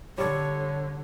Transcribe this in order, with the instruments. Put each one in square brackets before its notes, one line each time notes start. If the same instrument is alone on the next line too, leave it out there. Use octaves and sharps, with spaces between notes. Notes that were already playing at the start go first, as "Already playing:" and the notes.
[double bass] D3 [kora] G3 A4 [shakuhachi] C#5